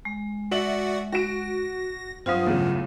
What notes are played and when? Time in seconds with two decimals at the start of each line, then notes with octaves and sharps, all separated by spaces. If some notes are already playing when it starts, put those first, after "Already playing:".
0.05 G#3
0.51 F#4 D5 E5 F#5 F#7
1.12 F#4 A#6 D7
2.26 G2 F#3 C4 F4 F5 D#6
2.46 E2 A2 C#3